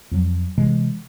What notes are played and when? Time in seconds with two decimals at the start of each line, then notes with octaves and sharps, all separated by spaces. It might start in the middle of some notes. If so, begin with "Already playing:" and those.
0.11 F2 F#3
0.58 C3 E3 G#3